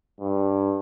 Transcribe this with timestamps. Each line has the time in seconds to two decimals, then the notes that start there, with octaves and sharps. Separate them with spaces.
0.21 G2